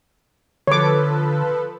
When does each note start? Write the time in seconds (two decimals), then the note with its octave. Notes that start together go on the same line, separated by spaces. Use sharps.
0.67 D3 F3 A4 B4 C#5 D6